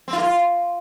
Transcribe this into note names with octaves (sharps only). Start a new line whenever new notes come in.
C4
F4
A#3
F4